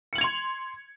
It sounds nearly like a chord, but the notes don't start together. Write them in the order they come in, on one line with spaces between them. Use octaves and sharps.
C#7 F#7 G#6 F7 C6